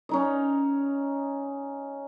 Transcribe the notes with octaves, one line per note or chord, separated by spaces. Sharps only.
C#4 D#4 D#5